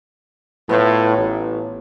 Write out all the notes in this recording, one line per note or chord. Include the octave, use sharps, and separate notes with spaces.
A2 B3 F4 B4
A1